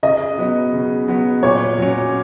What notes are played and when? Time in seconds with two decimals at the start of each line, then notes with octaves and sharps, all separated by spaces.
0.03 C#3 D#5
0.38 F#3 B3
0.73 C#3
1.08 F#3 B3
1.43 A#2 C#5
1.78 F#3 C#4